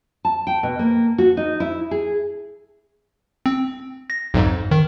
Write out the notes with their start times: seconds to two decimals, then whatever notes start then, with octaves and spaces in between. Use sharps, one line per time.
0.25 A5
0.47 G5
0.63 B2
0.79 A#3
1.18 F#4
1.37 D#4
1.60 E4
1.91 G#4
3.46 C4
4.10 A#6
4.34 B1 F2 G#2
4.71 D#3